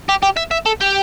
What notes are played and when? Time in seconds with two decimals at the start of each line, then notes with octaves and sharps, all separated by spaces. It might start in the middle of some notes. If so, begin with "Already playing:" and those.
0.09 G4
0.23 G4
0.37 E5
0.51 E5
0.66 A4
0.81 G4